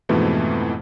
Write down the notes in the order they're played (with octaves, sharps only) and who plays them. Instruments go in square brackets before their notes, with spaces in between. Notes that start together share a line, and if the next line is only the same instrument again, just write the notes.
[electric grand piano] F2 G#2 B2 E3 F3 A3